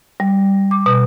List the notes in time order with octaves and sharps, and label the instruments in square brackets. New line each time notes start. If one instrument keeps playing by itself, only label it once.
[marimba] G3
D6
B2